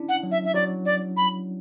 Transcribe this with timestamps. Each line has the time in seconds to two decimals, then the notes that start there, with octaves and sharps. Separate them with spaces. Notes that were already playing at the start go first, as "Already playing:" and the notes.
Already playing: C#4 D4 E4
0.09 F#5
0.23 F#3
0.31 E5
0.45 E5
0.54 F#3 D5
0.85 D5
1.17 B5